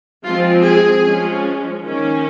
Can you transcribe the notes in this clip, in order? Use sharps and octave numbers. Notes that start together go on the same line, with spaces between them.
F3 G#3 C4 F4
G#4
F3 G#3 C#4
D#3 A#3 C#4